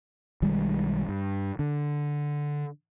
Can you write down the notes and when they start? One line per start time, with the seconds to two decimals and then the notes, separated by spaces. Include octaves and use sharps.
0.42 B1 D#3 G3 G#3
1.09 G2
1.59 D3